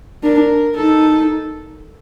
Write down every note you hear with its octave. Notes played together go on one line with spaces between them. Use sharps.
D4 A#4
D#4 A4